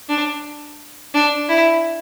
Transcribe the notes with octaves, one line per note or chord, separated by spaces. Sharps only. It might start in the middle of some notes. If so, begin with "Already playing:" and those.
D4
D4
E4